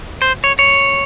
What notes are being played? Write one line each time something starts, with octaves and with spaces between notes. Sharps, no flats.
C5
C#5
C#5